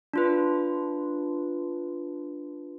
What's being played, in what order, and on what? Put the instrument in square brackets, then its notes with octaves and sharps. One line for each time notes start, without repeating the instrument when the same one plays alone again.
[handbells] D4 F4 B4